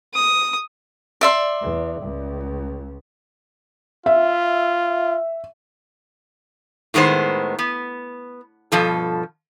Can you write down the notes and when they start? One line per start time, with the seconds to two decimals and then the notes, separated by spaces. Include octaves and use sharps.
0.14 D#6
1.21 D5 E5 C6
1.62 E2
2.02 C#2
4.06 F4 E5
6.94 A2 D#3 G#3 B3 C5
7.59 B3
8.72 G2 B2 F3 A4